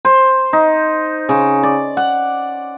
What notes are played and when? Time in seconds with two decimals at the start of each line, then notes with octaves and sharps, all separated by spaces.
0.05 C5
0.53 D#4
1.29 C#3
1.63 D5
1.97 F#5